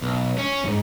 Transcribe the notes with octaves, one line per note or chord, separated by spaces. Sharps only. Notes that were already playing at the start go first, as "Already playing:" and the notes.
B1
C#4
F2 G#2